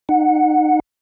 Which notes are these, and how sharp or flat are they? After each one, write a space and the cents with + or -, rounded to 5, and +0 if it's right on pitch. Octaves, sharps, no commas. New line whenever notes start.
D#4 -25 F#5 -10